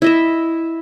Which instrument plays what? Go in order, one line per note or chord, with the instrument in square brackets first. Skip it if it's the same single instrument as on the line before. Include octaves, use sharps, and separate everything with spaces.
[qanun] E4 D#5 E5